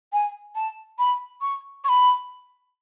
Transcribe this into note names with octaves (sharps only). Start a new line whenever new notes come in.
G#5
A5
B5
C#6
C#6
B5